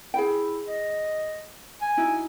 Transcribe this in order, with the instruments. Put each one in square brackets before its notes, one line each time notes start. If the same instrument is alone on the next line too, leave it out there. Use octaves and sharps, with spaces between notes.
[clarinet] E4 [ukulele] G#4 G5
[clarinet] D#5
G#5
[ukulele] D#4 E4 F#4